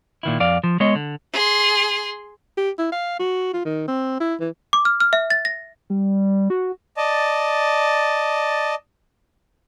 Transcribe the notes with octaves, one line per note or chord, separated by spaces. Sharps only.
A#2 D#3 E4
F2 D5 F5
F3
G#3 B3 C#5 D#5
D3
G#4 C6
G4
E4
F5
F#4
F4
D#3
C4
E4
E3
D6
F6
F6
E5
A6
A#6
G3
F#4
D5 D#5 A5